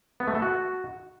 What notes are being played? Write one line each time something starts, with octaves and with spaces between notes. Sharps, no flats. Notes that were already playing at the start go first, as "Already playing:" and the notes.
B3
A3
A4
F#4